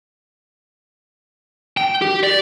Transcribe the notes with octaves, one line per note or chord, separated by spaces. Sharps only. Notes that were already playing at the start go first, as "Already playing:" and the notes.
G5
G4
D5